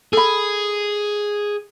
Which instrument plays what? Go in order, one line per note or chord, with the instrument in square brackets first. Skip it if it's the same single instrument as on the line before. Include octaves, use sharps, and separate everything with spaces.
[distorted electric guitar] G#4 [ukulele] A4 B5